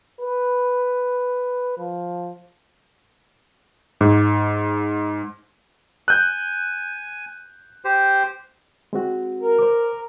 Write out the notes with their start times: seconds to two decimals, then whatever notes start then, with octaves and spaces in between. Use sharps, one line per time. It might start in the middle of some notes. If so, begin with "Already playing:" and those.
0.20 B4
1.78 F3
4.01 G#2
6.08 G#5 F#6 G6
7.85 G4 C5
8.93 G#3 C4 F#4
9.41 A#4
9.58 C5 D6